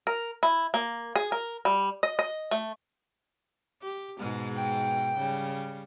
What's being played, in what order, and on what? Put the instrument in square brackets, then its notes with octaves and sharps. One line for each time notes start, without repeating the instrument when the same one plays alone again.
[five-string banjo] A#4
E4
A#3
G#4
A#4
G3
D#5
D#5
A3
[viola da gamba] G4
G#2 B2 G#3
[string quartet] G5
[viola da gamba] C#3 G3